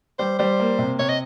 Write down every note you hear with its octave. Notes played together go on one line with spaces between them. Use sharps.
G3 C5
G3 C5
A#3
C3
C3 C#5
D#5